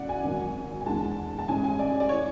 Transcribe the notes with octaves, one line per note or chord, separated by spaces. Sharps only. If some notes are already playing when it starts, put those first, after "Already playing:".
Already playing: E2 C#3 F#3 A3 D5 F#5
G#5
G#1 G#2 F#3
G#5
E2 D3 G#3 A5
A5
A1 G#2 G#3 G#5
G#5
D5
D5
E3 C#5